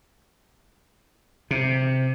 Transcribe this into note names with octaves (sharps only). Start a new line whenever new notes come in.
C3